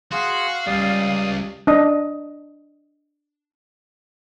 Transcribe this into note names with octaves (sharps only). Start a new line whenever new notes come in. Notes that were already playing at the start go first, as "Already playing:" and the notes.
F#4 G#4 F5 F#5 C6
C#2 G3 D5 D#6
D4 D#5